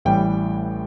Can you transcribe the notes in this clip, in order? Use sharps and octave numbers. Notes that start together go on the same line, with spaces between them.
A1 A2 E3 G3 G5